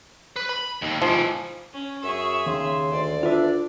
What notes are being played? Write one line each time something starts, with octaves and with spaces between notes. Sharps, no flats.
B4
B5
D#2
G#2 E3 F3
C#4
F#2 G#4 E5 C#6
D#2 C#3 C6
D2 D5
D4 F4 B4 E5